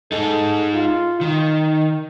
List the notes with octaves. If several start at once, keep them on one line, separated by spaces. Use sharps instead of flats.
D#4 G#4 A4
F4
D#3 D#4